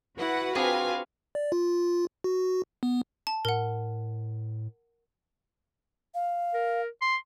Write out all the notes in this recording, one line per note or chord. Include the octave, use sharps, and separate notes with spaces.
E4 F#4 B4 F#5
C4 D4 F4 G#4 F5 G#5
D5
F4
F#4
B3
A5
A2 A#4 F#5
F5
A#4
C6